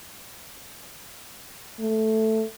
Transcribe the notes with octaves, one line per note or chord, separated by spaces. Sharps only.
A3